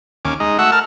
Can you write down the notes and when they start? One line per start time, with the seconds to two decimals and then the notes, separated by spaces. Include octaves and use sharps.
0.25 D#2 C#4 D6
0.40 G#3 D#4
0.59 A3 F#4 F#5 E6
0.72 A#4 A5 F6